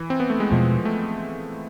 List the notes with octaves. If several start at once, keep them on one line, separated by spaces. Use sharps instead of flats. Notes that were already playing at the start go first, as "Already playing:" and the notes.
Already playing: E3
C4
B3
A3
G#3
E2 B2 F3 G#3
A3